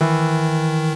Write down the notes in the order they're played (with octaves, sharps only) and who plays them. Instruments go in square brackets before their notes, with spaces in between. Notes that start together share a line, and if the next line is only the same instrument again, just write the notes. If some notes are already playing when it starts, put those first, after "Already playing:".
[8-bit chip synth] D#3 [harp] E3